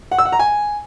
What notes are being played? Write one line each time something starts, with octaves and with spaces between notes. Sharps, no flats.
F#5
E6
F#5
A#5
G#5